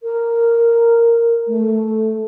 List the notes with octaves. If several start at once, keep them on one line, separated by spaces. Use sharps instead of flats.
A#4
A3